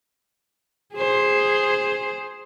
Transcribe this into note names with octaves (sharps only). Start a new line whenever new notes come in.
G#4 C5